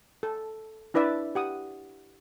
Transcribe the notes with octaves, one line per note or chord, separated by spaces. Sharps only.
A4
D4 E4 B4 D5 E5
G4 F#5 D#6